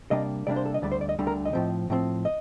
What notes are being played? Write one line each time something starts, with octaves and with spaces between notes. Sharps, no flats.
C3 G3 A#3 D4 D#5
C3 G3 A#3 D4 D5
C5
A4
D#5
D2 D3 G3 D5
C5
D5
D#5
D2 D3 G3
A#4
D#5
A2 F3 C4
A2 F3 C4
D#5